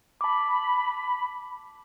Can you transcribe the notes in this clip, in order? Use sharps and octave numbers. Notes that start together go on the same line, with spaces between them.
A5 B5 D6